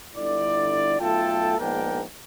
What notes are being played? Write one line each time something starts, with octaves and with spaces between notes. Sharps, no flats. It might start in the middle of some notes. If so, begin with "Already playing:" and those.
G1 D3 E4 D5
B1 A3 F4 A4 G5 A5
A#1 G#2 B3 D4 A#4 G5